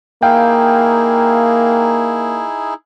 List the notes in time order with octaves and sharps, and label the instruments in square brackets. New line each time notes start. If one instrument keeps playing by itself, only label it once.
[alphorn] A#3 [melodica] D#4 E4 G#4 [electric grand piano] F5 G5